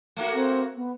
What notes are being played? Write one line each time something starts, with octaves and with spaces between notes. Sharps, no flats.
A3 A#3 F#4
C4
B3